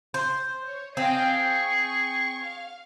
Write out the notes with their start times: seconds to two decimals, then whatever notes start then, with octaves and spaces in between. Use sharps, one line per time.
0.14 C5
0.66 C#5
0.97 C4 G#4 D#5 F5 G5
1.38 C#6
2.43 F5